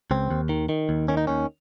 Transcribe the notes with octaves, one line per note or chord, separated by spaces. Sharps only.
C#2 C4
D#2
D#3
D#3
D#2
D#3 C#4
D#4
D#2 C#4